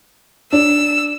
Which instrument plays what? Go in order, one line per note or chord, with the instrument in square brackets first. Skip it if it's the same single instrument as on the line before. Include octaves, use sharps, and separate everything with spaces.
[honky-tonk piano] D4 [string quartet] E6